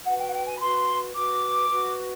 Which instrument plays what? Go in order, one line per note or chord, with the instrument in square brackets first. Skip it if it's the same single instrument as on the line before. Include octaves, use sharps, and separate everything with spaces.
[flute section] F#4 B4 F#5
G5
F#5
G5
G#5
B5
F#4 B4 C6
F#4 B4 D6
F#4 B4